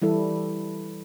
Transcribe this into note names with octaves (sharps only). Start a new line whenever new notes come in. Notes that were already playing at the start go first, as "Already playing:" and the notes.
E3 G3 E4 A4